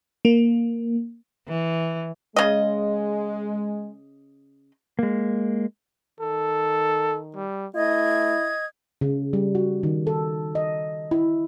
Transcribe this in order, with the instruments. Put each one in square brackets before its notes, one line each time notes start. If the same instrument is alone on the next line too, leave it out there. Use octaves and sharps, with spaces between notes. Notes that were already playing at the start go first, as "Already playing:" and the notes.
[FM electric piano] A#3
[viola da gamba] E3
[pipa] C#3 D#5 [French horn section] G#3
[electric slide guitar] G#3 A#3
[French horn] D#3 [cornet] A4
[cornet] G3
[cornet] A3 [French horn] E4 [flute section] D#5 D#6 G#6
[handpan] C#3
G3
F#4
D#3
A4
D#5
E4